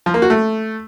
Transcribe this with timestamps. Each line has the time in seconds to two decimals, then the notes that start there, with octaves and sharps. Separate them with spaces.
0.06 F3
0.14 A#3
0.22 F#4
0.30 A3